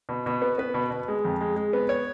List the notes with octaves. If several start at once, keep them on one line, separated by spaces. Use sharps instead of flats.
B2
B2
B3
B3 B4
B2
B2
G#3
F2
G#3
G#3
B3
C#5